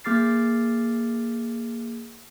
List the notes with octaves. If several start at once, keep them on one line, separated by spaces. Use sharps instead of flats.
A#3 G#4 D6 F6 A6 C7